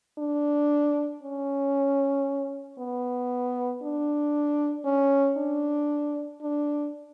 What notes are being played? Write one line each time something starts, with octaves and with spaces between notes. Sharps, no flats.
D4
C#4
B3
D4
C#4
D4
D4